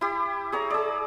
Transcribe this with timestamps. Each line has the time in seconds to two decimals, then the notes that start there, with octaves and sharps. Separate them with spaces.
0.01 E4 G4
0.52 G#4 C#5 A#5
0.70 G#4 D5